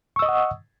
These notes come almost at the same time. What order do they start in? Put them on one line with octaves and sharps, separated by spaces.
C#6 E6 D#5 D#6 F#5